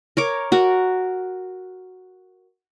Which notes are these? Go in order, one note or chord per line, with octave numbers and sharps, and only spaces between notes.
A#4 C#5 D6
F#4 A#4